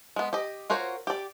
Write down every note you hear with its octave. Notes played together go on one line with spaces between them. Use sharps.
G#3 B3
G4 D#5
F4 F#4 A#4 C5 C#5
G4 D5